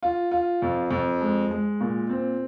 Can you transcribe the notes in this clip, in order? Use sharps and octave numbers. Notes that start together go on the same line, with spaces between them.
F4
F4
F2
F2
G#3
G#3
A#2
C4